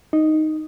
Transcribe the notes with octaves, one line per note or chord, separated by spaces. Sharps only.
D#4